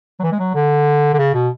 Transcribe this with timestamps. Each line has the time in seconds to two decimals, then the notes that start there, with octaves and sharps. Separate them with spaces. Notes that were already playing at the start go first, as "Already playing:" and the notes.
0.20 F#3
0.23 E3
0.32 G#3
0.39 F#3
0.55 D3
1.14 D3
1.18 C#3
1.34 B2